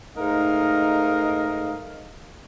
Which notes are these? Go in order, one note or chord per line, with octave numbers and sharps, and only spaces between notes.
G#2 A3 D#4 A#4 D#5 F5